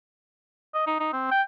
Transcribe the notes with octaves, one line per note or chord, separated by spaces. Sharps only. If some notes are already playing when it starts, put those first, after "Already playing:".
D#5
D#4
D#4
C4
G5